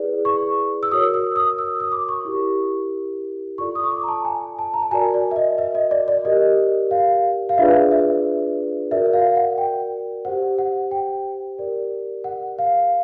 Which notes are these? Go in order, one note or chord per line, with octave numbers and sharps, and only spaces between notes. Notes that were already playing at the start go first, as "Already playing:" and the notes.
Already playing: E4 G#4 B4 D5
C#6
E6
F#4 A#4 C#5 D#6
E6
D#6
E6
D#6
D6
C#6
E4 G4 A#4
F4 A4 D5 C#6
D#6
C#6
D6
A#5
A5
G#5
A5
A#5
A5
F#4 A#4 D5 G#5
D5
E5
D#5
E5
D#5
D5
D5
G4 A#4 D5 D#5
F5
F5
D4 F4 G#4 B4 D5 E5
E5
F#4 A#4 D5 E5
E5
F5
F#5
G5
G4 C5 F#5
F#5
G5
G4 A#4 D5
F#5
F5